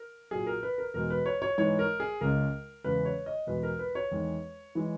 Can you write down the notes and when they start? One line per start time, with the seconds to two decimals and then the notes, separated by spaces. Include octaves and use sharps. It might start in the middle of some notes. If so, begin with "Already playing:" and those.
Already playing: A#4
0.31 A#2 F#3 G#4
0.47 A#4
0.63 B4
0.78 A#4
0.94 E2 B2 G#3 A#4
1.10 B4
1.26 C#5
1.42 C#5
1.58 G#2 E3 G#3 C#5
1.79 A#4
2.00 G#4
2.21 C#2 C#3 G#3 A#4
2.84 E2 C#3 G#3 B4
3.05 C#5
3.26 D#5
3.47 E2 B2 G#3 B4
3.63 A#4
3.79 B4
3.95 C#5
4.11 E2 D#3 G#3
4.75 E3 G#3